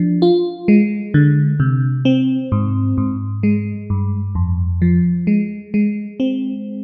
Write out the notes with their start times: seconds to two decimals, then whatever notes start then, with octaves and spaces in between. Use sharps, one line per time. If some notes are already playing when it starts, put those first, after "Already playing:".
Already playing: F3 D4
0.22 F4
0.68 G#3
1.14 D3
1.60 C3
2.05 C4
2.52 G#2
2.98 G#2
3.43 G#3
3.90 G2
4.35 F2
4.82 F3
5.27 G#3
5.74 G#3
6.20 C4